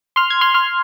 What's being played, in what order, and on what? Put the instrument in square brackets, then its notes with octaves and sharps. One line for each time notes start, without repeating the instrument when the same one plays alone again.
[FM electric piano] C6 F6
G#6
C6 F6
C6 F6